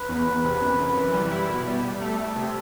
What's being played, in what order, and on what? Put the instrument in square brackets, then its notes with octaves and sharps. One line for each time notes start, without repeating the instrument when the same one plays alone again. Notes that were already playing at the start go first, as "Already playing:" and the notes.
Already playing: [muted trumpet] B4
[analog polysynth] E2
E2
C3
F#2
F#2
E3
G3
E4
B2
G3
G3
[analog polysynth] A3 [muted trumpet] A4
[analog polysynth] A3
C3